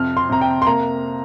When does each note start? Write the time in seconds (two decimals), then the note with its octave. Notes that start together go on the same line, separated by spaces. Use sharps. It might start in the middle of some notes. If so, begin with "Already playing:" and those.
Already playing: F2 C3 F6
0.17 C6
0.30 C3 A#5
0.41 G5
0.62 C6
0.66 A#3 A#5